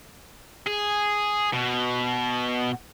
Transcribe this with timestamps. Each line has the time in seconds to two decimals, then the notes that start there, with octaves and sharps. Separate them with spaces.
0.66 G#4
1.53 B2